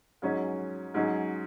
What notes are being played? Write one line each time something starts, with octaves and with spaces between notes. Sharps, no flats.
G#2 F#3 C#4 G#4
G#2 F#3 C#4 G#4